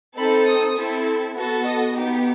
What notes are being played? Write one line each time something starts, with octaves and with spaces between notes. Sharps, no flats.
C4 D#4 A4 B5
D#6
C4 E4 A4
B3 F#4 A4
D#5
B3 D#4 G4